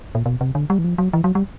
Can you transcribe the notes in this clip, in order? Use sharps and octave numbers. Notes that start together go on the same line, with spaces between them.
A#2
B2
C3
D3
G3
E3
F3
F#3
E3
F#3
G3